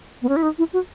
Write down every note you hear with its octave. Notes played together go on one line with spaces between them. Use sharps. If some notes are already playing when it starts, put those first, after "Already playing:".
B3
C#4
E4
D#4
E4
F#4